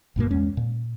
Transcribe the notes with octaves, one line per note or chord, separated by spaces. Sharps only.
A#1 G2 B2 A#3
E2 G#3 C#4
A#2